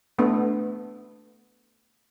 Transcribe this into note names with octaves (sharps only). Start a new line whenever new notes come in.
A3 B3 D4